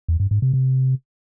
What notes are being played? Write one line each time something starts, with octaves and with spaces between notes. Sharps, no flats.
E2
G2
G#2
C3
C3